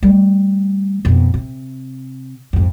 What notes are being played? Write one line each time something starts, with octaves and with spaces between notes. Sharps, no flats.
G3 A3
F2 B2
C3
F2 G#2